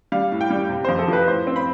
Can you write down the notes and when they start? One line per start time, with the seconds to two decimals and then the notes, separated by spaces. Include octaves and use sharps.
0.12 G3 F5
0.32 A2
0.41 G5
0.50 G3
0.70 C3
0.85 F2 C5
0.99 A4
1.08 F3 B4
1.27 A2 C5
1.47 C4
1.56 B5